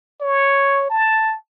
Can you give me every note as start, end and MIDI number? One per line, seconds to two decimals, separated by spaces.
0.21 0.90 73
0.90 1.35 81